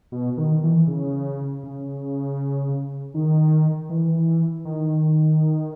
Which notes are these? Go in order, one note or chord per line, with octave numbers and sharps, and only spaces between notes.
B2
D#3
E3
C#3
C#3
D#3
E3
D#3